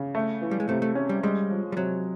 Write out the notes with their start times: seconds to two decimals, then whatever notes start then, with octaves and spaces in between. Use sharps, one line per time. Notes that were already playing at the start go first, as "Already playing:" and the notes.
Already playing: C#3
0.15 A3
0.42 E3
0.51 G3
0.60 G#3
0.69 C3 A3
0.82 A3
0.95 C#4
1.09 G3
1.23 G3 G#3
1.50 F3
1.72 G3
1.77 C3 F#3